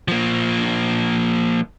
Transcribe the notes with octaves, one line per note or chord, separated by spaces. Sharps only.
F3 A#3